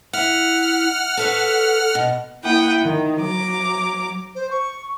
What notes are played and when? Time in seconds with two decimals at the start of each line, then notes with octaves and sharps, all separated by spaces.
0.13 E4 F#5 F6
1.17 A4 B4 C#5
1.95 B2
2.43 A#3 E4 F#5 G5 D#6
2.81 D#3
3.20 F#3 A#5 D6
4.35 C5
4.51 C#6